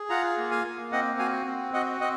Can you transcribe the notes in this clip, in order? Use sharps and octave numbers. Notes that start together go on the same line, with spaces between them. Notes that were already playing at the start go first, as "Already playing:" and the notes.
Already playing: G#4
F4 F#5 A#5
A#3
F5 G#5
A#3
C4 D#5 F#5
F#4 F5 G#5
C4
F#4 D#5 F#5
C4 D#5 F#5